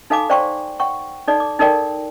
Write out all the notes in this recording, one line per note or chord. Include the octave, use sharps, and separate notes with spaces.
D#4 A4 F5 G#5 B5 D6
C5 D5 F5 G5 C6 C#6
F#5 G5 C#6
D#4 A4 D5
D6
D#4 A4 A#4 D5 G5